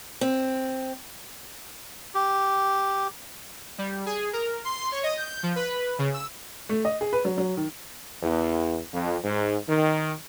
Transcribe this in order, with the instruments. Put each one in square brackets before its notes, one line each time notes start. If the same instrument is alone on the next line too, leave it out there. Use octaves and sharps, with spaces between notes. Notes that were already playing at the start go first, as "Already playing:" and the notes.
[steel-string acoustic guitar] C4
[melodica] G4
[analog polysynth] G3
G#4
A#4
C6
C#5
D#5
G6
F3
B4
C#3
E6
[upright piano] A3
D#5
G#4
B4
F#3
F#3
D#3
[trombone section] E2
F2
G#2
D#3